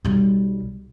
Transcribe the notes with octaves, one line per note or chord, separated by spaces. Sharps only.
B1 G3